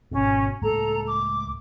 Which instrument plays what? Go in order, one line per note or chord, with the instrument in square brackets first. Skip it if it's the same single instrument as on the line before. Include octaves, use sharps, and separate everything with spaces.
[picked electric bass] G#1 B2 [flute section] C#4
[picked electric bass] C#2 A2 A#3 [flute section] A4 A#5
[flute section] D6